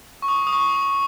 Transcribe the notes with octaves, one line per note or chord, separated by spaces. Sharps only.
C#6
D#6
D#6
C#6
D#6